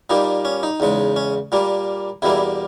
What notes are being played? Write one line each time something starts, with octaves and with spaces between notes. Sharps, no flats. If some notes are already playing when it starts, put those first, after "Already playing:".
A#2 G3 A#3 D#4
C#4
D#4
E2 C#3 G#3
C#4
A#2 G3 A#3
E2 B2 G3 A#3 E4